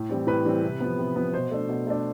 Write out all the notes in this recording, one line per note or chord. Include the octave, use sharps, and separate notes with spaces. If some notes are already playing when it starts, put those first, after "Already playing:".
Already playing: A2
E3 G3 C4
A2 B4
E3 G3 C4
C3
F3 B3
C3
F3 B3
B2 C5
A3 D4
B2
A3 D4